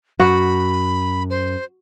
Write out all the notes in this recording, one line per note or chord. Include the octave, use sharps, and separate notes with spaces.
F#2 F#4 B5
C5